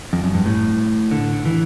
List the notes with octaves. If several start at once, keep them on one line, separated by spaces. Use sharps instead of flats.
F2
F#2
G2
A2
D3
E3